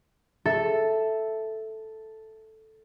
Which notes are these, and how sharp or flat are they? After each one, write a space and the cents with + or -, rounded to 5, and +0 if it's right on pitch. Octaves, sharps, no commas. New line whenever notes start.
A4 +0 E5 +0